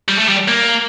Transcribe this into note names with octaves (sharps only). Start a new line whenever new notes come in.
G3
A3
G3
A#3